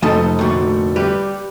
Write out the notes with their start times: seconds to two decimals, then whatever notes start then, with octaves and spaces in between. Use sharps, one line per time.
0.02 F1 F3 D#4 A4 D#5 A5
0.39 D2 A#2
0.96 G3 G4 B4